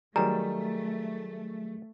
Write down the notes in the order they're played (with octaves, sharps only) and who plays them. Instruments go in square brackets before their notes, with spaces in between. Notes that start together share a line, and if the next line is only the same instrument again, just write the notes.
[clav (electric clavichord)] D#3 G3 [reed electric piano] F#3 G#4 [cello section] A3 [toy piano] A#5